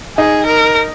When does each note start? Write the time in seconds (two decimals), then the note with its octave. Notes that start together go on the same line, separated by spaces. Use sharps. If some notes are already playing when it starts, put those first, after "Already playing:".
0.17 D#4 G#4
0.46 A#4